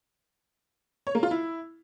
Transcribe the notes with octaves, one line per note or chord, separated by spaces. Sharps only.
C#5
A#3
F4
E4